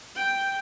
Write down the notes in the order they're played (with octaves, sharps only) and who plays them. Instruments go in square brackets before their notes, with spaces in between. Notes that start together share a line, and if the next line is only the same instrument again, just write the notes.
[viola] G5